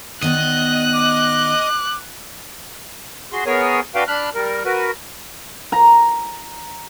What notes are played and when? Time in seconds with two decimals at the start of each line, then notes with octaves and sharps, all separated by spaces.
0.22 D#3 B3 D5 D#5 F#6
0.94 D6
3.32 F#4 G#4 C6
3.46 B3 G#4 A#4 C#5 G#5
3.95 D4 F#4 B4 F5 G5
4.08 D4 B5 F6 F#6
4.35 G3 A#4
4.65 F#4 A#4 B4
5.72 A#5